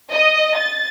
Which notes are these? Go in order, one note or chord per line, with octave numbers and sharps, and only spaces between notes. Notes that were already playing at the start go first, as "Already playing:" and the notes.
D#5
A6